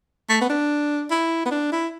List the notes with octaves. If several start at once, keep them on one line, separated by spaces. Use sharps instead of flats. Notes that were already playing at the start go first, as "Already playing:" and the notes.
A3
B3
D4
E4
B3
D4
E4